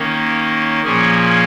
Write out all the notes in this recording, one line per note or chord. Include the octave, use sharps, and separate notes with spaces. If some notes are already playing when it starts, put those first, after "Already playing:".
Already playing: D#3 A#3 C#4
A#2 F3 A#3 C#4 G#4